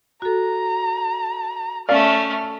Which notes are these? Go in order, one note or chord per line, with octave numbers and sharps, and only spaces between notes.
F#4 A4 A#5
A3 C#4 D5 F5 F6